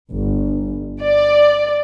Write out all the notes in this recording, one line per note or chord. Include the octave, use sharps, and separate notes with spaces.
G1
D5